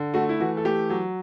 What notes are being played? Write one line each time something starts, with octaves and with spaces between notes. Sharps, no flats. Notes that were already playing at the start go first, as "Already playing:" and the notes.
Already playing: D3
A3 F#4
E4
E3 F#4
A4
A3 G4
F#3